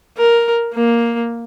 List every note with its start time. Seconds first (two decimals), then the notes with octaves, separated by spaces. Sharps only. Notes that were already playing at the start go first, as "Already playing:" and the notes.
0.17 A#4
0.74 A#3